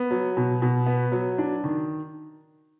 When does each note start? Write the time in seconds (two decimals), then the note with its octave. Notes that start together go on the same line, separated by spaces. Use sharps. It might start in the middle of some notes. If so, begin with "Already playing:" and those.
Already playing: B3
0.11 F#3
0.37 B2
0.62 B2
0.86 B3
1.12 F#3
1.38 D4
1.64 D#3